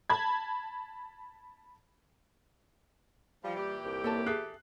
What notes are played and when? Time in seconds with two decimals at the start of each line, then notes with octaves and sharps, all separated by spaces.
0.10 A5 B5 G#6
3.44 F3 G3
3.56 A#2 E3 G4
3.85 C2
4.04 A#3 A4 C#5 A5
4.26 G#4 A4 E5 F#6 C7